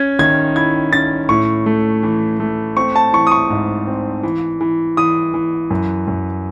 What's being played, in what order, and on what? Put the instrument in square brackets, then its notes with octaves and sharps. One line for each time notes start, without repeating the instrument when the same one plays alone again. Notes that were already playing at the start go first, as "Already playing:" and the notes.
Already playing: [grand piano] C#4 G#6
D#3 G#6
E4 G#6
C#4 A6
A2 C#6
A3
E3
A3
C4 C#6
A5
E3 C#6
D#6
C#6
G#2
C4
E3
E3
E3 D#6
E3
F#2
F#2